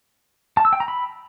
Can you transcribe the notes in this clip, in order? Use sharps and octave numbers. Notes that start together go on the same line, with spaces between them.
A5
E6
G5
A#5
B5